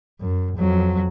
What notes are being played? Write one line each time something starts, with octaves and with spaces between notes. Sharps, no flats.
F#2
F2 F#3